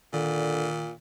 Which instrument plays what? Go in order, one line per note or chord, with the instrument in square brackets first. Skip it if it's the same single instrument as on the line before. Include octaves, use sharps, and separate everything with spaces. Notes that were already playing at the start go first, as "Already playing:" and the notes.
[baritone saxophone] A#2 [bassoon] D3 [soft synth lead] D#3